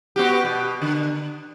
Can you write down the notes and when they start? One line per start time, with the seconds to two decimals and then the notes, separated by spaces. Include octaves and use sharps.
0.16 B3 F#4 G4
0.45 B2
0.82 D3